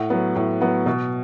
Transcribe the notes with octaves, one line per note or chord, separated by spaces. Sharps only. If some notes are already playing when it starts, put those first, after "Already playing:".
Already playing: A2 F#5
F#3 B3
A2
F#3 B3
B2